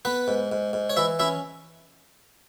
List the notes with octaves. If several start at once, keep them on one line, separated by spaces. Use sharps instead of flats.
B3 B4
G#2
G#2
G#2
C#5
E3 E4 E5
C#4 E4 E5